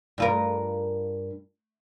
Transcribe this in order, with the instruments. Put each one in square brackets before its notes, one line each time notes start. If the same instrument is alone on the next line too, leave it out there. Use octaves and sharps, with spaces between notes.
[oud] G2 F4 A#4